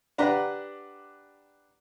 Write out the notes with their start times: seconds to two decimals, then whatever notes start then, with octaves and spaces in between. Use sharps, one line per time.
0.18 D4 G4 B4 F#5 A#5